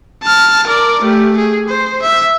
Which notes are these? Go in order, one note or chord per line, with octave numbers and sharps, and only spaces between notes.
A5 F6
A#4 D5
A3 G4
G#4
C5
E5